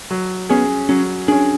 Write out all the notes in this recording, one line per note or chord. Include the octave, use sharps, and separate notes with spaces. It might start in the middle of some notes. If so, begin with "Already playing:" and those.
F#3
B3 C#4 G#4
F#3 C#4
C#4 D4 G#4